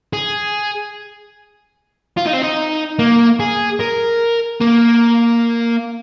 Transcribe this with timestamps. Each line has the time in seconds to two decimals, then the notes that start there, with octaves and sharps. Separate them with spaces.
0.13 G#4
2.17 F4
2.26 D#4
2.33 C4
2.42 D#4
2.99 A#3
3.40 G#4
3.80 A#4
4.61 A#3